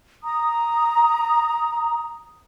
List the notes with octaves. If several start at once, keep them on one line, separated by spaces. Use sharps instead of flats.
A#5 D#6